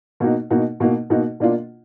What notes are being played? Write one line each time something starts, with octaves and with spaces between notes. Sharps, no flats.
B2 A#3 D#4 F#4
B2 A#3 D#4 F#4
B2 A#3 D#4 F#4
B2 A#3 D#4 F#4
B2 A#3 D4 F4